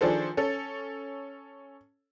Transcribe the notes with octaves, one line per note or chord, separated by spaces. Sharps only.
D#3 F3 D4 G#4 A4 C5
C#4 A4